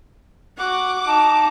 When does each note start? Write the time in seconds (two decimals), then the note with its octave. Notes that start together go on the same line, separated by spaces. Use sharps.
0.58 F#4 F#5 D6
1.07 D#4 A5